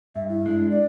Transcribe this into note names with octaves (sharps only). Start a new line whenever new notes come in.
G2 E5
E4
G#3 D4
D5